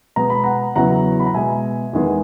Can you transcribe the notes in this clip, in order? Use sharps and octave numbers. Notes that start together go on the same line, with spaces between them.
B2 G#3 B3 A#5
B5
F#5 A#5
E2 C#3 F#3 B3 E4 F#5 A#5
B5
A#5
B2 G#3 B3 E5 G#5
E2 D#3 G#3 B3